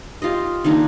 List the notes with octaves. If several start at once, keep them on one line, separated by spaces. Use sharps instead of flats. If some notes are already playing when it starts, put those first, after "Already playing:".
F4 G4 D#5
D#3 A#3 D4 D#4